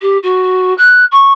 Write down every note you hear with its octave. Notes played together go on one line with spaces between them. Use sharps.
G4
F#4
F#6
C#6